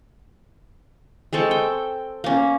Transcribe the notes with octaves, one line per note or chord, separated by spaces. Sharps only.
G#3 C4 A4 C#6
G5
A#3 C#4